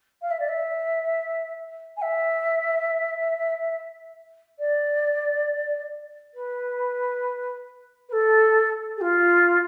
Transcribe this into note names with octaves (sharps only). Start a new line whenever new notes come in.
F5
E5
D5
E5
G#5
E5
D5
B4
B4
A4
G#4
F4